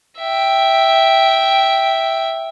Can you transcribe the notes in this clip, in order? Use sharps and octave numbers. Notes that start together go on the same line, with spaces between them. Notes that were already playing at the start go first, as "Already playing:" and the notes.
E5 G5